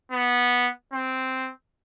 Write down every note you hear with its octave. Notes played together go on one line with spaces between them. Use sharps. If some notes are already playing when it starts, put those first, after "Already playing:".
B3
C4